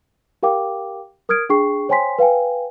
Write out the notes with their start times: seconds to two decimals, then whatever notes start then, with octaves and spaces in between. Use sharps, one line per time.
0.43 G4 A#4 F5 G5 D6
1.29 A#4 D#6 F6 G#6 D7
1.49 D4 G#4 G5 C#6 C7
1.89 C5 C#5 G5 G#5 C6 B6
2.19 B4 F5 G5 G#5